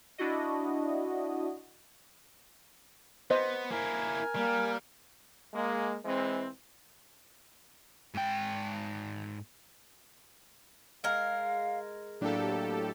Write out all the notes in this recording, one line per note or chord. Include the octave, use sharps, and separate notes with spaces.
D4 E4 F#4 D#5
B3 C5 D#5
A#3 E4 A#4 G#5
G3 A#3
G#3 A#3
E3 G#3 C4
G#2 G5
G#3 A#4 F5
A2 F#3 A#3 D4 G4 A4